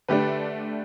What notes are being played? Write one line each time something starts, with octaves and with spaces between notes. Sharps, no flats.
D3 A3 D4 G4 B4